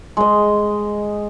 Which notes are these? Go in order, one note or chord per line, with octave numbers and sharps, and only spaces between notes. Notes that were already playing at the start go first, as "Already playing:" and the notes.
G#3 D#5